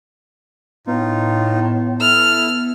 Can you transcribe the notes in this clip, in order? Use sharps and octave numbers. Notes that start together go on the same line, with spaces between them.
A2 B3 D#4 F4
E4 A4 F6